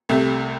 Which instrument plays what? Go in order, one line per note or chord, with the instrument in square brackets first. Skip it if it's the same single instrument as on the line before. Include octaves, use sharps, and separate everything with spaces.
[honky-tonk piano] C2 C3 A3